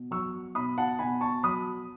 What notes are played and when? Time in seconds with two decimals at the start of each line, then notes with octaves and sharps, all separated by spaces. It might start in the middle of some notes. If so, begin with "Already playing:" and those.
Already playing: B2
0.11 F#3 C#6 E6
0.55 B2 B5 D#6
0.78 F#5 A5
0.99 B2 G#5 B5
1.21 A5 C#6
1.43 F#3 B5 D#6